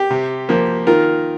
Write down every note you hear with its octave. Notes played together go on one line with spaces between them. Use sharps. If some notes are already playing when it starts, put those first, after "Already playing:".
Already playing: G4
C3
F3 A#3
D#3 F4 A#4